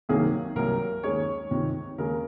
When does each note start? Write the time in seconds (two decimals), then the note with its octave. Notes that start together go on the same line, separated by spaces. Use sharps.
0.09 C2 C3 D#3 F#3 A#3 G#4
0.56 C2 C3 F#3 A#3 A#4
1.03 D#2 D#3 G#3 C#4 C#5
1.51 C#2 C3 D#3
1.98 D#2 C#3 G#3 A#4